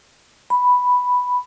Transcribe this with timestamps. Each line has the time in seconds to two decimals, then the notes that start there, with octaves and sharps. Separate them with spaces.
0.50 B5